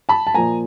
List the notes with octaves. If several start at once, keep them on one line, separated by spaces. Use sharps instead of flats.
A5 B5
A5
A#2 F3 A#3 G#5 A#5